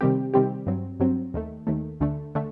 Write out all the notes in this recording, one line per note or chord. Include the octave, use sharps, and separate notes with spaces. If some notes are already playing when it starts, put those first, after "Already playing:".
C3 D#3 G3 C4 G4
C3 D#3 G3 C4 G4
G2 F#3 C4
G2 F#3 C4
D#2 D#3 A3
D#2 D#3 A3
D2 D3 A3
D3 A3